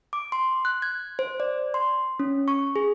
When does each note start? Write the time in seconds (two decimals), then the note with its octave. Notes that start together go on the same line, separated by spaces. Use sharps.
0.13 D6
0.32 C6
0.65 F#6
0.82 G#6
1.19 C5
1.40 D5
1.74 C6
2.20 C#4
2.48 C#6
2.76 G#4